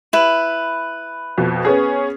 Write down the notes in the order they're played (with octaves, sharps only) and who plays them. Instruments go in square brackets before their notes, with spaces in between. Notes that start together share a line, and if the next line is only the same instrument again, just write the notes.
[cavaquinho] E4 B4
[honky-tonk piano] F2 B2
B3 C#4 G#4